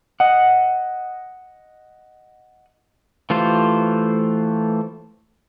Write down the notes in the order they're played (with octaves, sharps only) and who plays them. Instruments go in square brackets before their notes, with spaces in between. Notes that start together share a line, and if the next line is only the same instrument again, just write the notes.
[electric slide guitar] D#5 F#5
[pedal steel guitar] E3 A3 F4 G4 C5